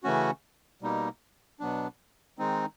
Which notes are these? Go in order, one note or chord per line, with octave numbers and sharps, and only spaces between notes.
C#3 E3 A3 C#4 F#4
B2 G3 A#3 D#4
B2 F#3 B3 D4
D#3 G#3 C4 D#4